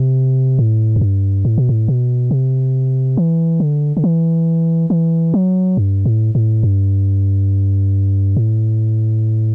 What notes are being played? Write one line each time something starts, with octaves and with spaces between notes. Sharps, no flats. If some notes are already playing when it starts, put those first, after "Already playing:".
Already playing: C3
A2
F#2
G2
A2
B2
A2
B2
C3
E3
D3
D3
E3
E3
F#3
G2
A2
A2
G2
A2